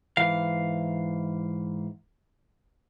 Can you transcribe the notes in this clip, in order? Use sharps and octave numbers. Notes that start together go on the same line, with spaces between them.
G#2 E3 F5